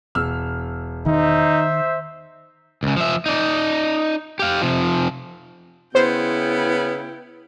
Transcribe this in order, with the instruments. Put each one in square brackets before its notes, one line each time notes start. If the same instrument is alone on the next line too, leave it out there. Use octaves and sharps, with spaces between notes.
[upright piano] E1 E6 F6
[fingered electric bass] D#3 [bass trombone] D#4 [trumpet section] C5 E5
[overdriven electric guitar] C#2 C#3
F3 E5
D#4 D5
G4 F5
C3 F3
[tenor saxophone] C#3 [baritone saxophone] B3 [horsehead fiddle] E4 G5 [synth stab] C5